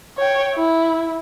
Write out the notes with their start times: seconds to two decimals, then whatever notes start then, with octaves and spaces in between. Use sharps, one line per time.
0.18 C#5 G5
0.55 E4